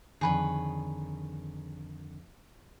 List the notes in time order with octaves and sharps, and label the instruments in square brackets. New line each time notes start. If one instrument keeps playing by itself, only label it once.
[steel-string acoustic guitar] F2 D3 D#3 [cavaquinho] G#4 B4 C#5